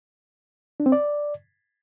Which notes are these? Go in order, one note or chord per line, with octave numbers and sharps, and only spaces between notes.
D4
C4
D5